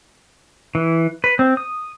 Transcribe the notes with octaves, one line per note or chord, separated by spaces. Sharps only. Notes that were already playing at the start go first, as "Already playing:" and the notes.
E3
B4
C4
D#6